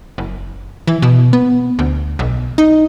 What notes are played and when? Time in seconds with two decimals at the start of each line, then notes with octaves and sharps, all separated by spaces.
0.18 F#1
0.87 E3
1.02 B2
1.33 B3
1.79 D2
2.19 B1
2.58 D#4